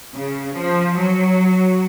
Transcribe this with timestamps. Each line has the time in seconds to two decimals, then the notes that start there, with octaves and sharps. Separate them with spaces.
0.14 C#3
0.55 F3
0.97 F#3